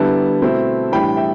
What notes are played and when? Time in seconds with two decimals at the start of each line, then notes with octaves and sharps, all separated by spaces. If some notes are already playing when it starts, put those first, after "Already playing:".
Already playing: D3 G3 B3 E4 A5
0.41 B2 A3 C4 E4
0.92 A2 E3 G3 D4 G5 B5
1.17 E5 G5